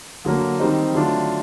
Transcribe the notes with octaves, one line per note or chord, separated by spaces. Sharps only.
D3 F#3 A#3
D#3 G3 C4 D#4
D3 F#3 A3 D4 F4